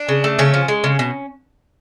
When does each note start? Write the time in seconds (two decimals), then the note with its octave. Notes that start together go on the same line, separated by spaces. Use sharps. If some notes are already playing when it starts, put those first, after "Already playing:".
Already playing: D4
0.09 C#3
0.24 A3
0.39 C#3 C#4
0.54 F3
0.68 G#3
0.84 C#3
0.99 B2